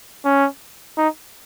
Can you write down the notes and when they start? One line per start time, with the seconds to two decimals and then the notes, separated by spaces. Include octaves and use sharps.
0.25 C#4
0.97 D#4